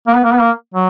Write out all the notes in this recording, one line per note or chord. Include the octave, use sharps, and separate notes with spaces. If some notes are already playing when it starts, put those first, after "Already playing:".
A#3
B3
A#3
B3
A#3
F#3